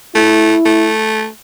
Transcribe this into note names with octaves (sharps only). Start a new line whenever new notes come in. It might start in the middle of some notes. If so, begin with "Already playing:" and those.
A3 E4
A3